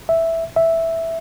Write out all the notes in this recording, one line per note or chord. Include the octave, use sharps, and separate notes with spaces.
E5
E5